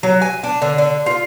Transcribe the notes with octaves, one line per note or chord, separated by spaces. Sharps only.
F#3
G#5
D4
D3
D3
F4